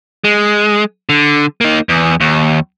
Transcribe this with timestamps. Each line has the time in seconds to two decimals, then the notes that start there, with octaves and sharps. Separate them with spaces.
0.24 G#3
1.09 D3
1.61 A#3 D#4
1.89 E2
2.21 D#2